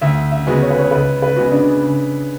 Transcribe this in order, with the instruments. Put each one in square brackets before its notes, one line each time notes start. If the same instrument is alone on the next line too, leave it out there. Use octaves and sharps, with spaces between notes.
[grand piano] D2 [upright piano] E5
[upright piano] E5
[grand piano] C#3 G#3 B3 F#4
[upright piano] C#5
B4
C#5
[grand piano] C#2 [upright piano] B4
[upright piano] B4
[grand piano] C#3 G#3 B3 F#4
[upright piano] D4
[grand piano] C#3